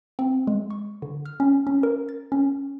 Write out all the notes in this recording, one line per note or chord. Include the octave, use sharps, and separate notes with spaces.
C4
G#3
C#6
D3
F6
C#4
C#4
A#4
A6
C#4